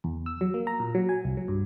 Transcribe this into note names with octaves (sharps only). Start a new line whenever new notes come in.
E2
E6
F#3
A#3
A#5
A#2
F#3
G#5
C2
F#3
G2